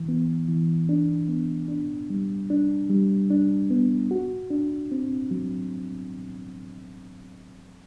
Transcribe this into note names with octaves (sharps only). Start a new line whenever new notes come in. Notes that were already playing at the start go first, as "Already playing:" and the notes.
Already playing: E3
B3
E3
D4
B3
D4
G3
D4
G3
D4
B3
F#4
D4
C4
F#3